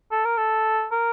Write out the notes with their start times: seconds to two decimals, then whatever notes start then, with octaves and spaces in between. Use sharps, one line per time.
0.12 A4
0.25 A#4
0.38 A4
0.92 A#4